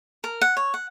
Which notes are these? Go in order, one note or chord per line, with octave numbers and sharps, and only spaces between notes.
A#4
F#5
C#5
F#5